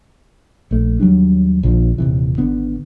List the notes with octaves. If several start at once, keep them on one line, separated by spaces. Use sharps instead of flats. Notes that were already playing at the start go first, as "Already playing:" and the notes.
A#1 A3
D#2 F#3 G3 D4
A#1 D3 F3
D#1 C3 E3
G#1 D3 B3